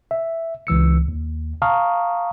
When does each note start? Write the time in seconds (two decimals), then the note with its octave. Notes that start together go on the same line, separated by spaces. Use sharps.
0.11 E5
0.67 C#2 E3 E6 C#7
1.08 D#2
1.62 F5 A5 A#5 C#6 D#6 F6